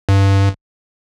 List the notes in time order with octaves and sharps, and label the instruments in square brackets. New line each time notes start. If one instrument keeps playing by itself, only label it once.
[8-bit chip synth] G2